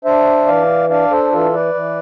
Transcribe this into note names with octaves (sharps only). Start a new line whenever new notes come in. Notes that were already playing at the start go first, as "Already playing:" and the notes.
D4 C5 E5
E3 D5 F5
D4 D5 F5
A4 C5
E3 F4 A4
B4 D5
E3